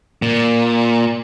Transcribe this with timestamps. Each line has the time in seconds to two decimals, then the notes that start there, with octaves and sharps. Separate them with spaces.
0.22 A#2